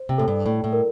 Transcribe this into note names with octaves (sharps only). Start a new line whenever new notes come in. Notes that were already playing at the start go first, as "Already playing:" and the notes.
Already playing: C5
C3
A2 A4
G2
A2 D5
A2
A#4